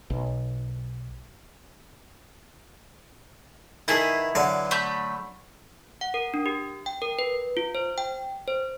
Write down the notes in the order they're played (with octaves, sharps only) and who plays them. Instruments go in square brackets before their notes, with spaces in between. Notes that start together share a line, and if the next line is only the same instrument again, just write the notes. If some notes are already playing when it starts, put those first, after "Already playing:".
[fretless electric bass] B1
[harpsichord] D#3 A4 [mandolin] B3 E4 G#4
[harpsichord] D3 F#3 F5
[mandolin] A3 B5 G6
[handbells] F#5
A#4
D4
G4
G5
A#4
B4
F4
C5
G5
C5